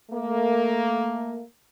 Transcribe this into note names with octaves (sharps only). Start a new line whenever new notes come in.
A3 A#3